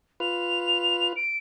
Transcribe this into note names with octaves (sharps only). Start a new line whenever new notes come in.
F4 B4 F7
D7